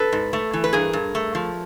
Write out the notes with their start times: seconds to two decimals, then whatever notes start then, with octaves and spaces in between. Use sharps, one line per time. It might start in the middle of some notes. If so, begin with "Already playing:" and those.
Already playing: A4 B4
0.13 G#2
0.33 A3
0.53 E3
0.64 B4
0.73 G2 G#4 A#4
0.93 G2
1.15 A3
1.35 F3